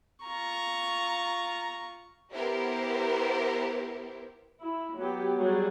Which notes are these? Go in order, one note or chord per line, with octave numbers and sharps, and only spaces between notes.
F4 A#5 C#6
B3 E4 G4 A#4 C5
E4
F#3 B3 G4
F#3 G3 F#4 G#4